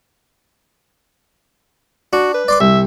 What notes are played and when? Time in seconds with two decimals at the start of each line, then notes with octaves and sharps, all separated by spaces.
2.13 D4 F#4
2.34 B4
2.48 D5 C6 D6
2.60 C2 E5